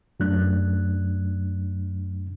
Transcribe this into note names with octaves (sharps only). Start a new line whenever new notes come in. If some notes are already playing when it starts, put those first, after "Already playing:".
F#2 F#3 A3 D4 F#6